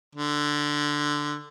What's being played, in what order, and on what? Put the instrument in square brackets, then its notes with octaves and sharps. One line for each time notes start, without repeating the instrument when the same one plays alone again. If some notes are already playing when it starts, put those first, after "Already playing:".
[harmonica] D3